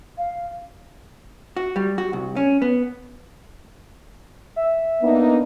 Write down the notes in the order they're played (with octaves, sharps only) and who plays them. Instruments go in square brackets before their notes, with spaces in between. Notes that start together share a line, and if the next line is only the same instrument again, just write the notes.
[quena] F5
[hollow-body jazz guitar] F#4
G3
F#4
C2
C#4
B3
[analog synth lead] E5
[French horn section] A#3 D4 D#4 [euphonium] B3